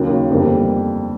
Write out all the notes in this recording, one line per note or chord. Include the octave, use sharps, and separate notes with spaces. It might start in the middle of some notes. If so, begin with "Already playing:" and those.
Already playing: D#2 C#3 F#3 A#3
G1 F2 D3 G3 A#3